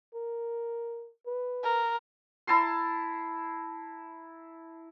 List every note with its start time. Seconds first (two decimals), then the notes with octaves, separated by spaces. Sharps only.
0.14 A#4
1.26 B4
1.63 A#4
2.47 E4 A5 A#5 C6